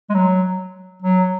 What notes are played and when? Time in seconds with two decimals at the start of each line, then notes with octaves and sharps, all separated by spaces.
0.10 G#3
0.14 F#3
1.02 F#3